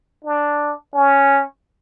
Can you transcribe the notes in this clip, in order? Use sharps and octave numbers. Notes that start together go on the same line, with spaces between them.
D4
C#4